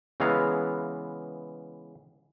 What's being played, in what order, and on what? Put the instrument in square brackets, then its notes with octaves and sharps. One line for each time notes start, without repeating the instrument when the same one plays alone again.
[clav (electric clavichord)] C#3 E3 G#3 B3 F5 A#5